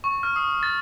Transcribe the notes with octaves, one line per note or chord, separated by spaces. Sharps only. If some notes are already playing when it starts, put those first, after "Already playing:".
C#6
F6
D#6
A6